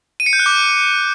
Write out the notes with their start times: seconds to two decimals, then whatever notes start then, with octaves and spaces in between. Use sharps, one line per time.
0.20 D#7
0.26 C#7
0.33 G6
0.39 F#6
0.46 D6